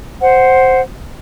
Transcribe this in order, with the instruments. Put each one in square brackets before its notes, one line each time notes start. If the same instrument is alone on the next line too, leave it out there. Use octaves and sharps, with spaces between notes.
[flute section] C5 F#5